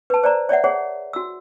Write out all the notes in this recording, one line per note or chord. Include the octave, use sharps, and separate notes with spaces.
B4 A5
C5 D5 A#5
C#5 D5 E5 F#5
G#4 C#5 F#5
F#4 E6